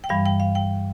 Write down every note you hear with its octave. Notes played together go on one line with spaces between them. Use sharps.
G5
G2 E3 G3 F5
G5
F5
G5